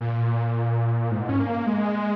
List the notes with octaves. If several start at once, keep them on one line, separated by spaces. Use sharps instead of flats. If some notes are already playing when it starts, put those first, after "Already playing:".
A#2
G#2
C#4
A#3
G#3